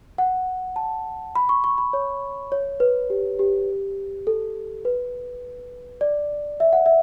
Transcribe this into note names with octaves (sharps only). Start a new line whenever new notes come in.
F#5
A5
B5
C#6
C#6
B5
C#5
C#5
B4
G4
G4
A4
B4
D5
E5
F#5
E5